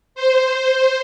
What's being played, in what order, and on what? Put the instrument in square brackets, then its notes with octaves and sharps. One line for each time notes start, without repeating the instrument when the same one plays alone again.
[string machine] C5